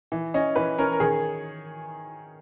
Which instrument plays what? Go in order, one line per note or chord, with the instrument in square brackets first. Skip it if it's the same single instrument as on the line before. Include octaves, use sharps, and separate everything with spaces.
[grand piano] E3
C#4 D#5
E3 B4
C#4 A#4
A#4
D#3 G#4